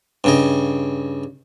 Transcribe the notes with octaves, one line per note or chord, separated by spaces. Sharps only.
G2 C#3 D#5